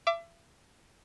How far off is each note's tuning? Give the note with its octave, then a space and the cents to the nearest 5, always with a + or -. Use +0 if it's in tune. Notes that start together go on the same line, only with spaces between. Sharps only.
E5 +35 D6 +0